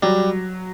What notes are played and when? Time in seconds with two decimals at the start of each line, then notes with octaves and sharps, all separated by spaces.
0.03 F#3 G3